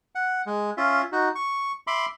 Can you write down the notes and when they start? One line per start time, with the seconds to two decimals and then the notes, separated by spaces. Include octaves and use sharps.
0.15 F#5
0.46 G#3
0.77 C#4 F4 E5
1.12 D#4 F#4
1.35 C#6
1.87 E5 B5 C6 D6